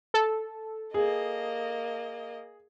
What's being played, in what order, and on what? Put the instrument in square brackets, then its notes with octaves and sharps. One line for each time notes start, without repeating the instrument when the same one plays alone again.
[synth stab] A4
[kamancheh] A#3 D#5 [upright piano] G#4